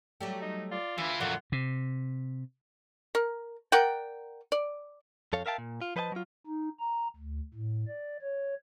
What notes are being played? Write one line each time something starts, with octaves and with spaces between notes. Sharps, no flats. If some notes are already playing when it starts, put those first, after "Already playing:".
F#3 G3 A3 G4
D#4
F4 D5
D2 E3 E4 E5
F2 A#2 D3 E3 F#3 F#5
C3
A#4
A#4 D5 F#5 G5
D5
F2 A4 C#5 F5
A#4 E5 F5 G5 A5
A#2
F4
F3 B4 C5 D#5 G#5 A5
F#3 F4
D#4
A#5
D2
A2
D5
C#5